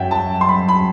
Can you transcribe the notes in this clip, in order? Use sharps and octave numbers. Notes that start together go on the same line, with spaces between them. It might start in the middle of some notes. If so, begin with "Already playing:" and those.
Already playing: F#2 F#3 E5 F#5 G5
A5
C6
B5
B5